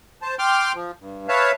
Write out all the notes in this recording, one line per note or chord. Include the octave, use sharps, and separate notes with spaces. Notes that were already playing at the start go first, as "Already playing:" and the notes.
C5 A5
G5 C6 D6 F6
F3
G2
B4 C#5 E5 F5 A5